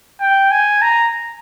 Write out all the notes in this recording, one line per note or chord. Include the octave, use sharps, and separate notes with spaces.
G5
G#5
A#5